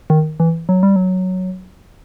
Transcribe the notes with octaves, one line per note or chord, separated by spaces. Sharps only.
D#3
E3
F#3
G3
F#3